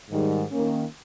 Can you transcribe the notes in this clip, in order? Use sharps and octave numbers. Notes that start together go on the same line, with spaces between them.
G#2 D#3 G3
D#3 A#3 C#4